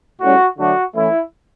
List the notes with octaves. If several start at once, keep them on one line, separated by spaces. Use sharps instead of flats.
A2 G3 C#4 F#4
D3 F#3 A3 D4 F#4
E3 A3 C#4 E4